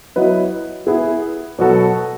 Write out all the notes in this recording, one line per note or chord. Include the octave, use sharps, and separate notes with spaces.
F#3 B3 E4 B4 D#5
B3 E4 G#4
B2 F#3 B3 F#4 A4